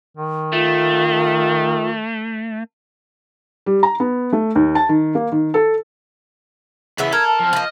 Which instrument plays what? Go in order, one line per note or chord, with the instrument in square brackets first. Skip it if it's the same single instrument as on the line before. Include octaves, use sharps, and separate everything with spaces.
[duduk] D#3
[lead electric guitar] A3 [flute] F4
[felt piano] G3
A#5
B3
A3
D#2
A5
D#3
A#3
D#3
A4
[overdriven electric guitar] E2 E3 [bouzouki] C#3 B3 E5
[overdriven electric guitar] A4 [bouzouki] A#4 [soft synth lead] F6 [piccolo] G#6
[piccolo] A5
[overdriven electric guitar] F3 C4
[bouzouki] F3 A#3 [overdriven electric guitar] B4 D#5